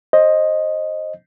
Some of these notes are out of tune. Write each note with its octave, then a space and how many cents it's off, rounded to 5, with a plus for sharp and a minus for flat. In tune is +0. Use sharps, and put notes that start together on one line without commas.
C5 +20 D#5 +0